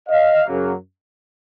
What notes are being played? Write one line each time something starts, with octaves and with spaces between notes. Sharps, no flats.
D#5 F5
F#2 C#3 F#3 A#3